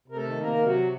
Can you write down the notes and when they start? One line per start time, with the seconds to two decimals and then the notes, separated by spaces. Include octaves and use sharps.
0.08 C3 A#4
0.16 A3 A4
0.25 D#3
0.41 C3 A#3 A#4
0.57 C3
0.66 F#3 F#4